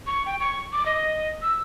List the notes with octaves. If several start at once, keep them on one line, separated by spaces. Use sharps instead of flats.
C#6
G5
C#6
D6
D#5
E6